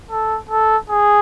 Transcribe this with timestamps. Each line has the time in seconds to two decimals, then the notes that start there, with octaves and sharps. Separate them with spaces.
0.11 A4
0.49 A4
0.90 G#4